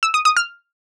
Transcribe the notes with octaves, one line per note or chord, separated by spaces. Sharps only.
E6
D#6
D#6
F6